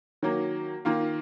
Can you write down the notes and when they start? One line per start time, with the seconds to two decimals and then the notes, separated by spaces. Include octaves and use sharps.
0.23 D#3 F#3 A#3
0.85 D#3 A#3 F4